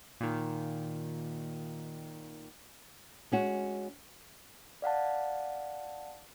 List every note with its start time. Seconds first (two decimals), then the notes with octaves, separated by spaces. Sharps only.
0.21 A#2 D#3
3.32 G#3 C#4 F#4
4.82 D5 F5 F#5 A5